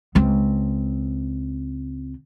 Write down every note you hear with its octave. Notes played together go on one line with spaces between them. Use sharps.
C#2 C4